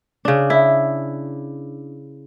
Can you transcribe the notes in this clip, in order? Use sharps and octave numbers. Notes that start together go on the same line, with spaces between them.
C#3 D4
E4